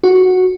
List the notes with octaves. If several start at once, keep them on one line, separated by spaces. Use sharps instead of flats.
F#4